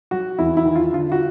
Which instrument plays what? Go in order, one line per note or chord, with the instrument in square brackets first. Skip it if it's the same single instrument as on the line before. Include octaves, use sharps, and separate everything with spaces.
[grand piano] F#3 F#4
E2 E4
E4
D#3
F4
D3 F4
F#4